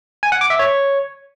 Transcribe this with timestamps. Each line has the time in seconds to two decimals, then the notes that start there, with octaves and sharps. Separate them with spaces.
0.23 G#5
0.32 F#5
0.41 D6
0.50 E5
0.59 C#5